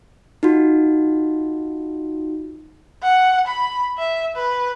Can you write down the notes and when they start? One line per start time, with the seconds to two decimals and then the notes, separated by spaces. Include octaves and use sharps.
0.43 D#4 F4 F#4
3.02 F#5
3.47 B5
3.98 E5
4.36 B4